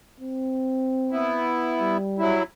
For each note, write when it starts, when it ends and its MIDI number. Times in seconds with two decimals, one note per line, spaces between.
0.20 1.45 60
1.11 1.97 59
1.11 1.97 64
1.80 2.38 55
2.19 2.43 54
2.19 2.43 64